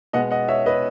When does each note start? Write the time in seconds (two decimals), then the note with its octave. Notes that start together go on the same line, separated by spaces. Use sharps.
0.13 B2 G#3 B3 D#5 F#5
0.31 D#5 F#5
0.48 C#5 E5
0.66 B4 D#5